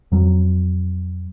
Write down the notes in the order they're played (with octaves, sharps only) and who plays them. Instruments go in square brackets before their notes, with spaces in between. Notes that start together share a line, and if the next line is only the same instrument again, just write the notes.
[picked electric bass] F2 F#3